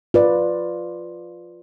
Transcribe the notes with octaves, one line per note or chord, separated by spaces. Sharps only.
F4 B4 D5